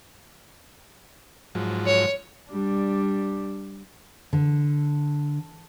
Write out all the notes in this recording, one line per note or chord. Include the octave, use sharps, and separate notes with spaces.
G#2 F3 F#3
C#5
G3 D4
D3